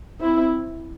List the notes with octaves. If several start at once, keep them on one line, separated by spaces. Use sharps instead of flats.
C4 E4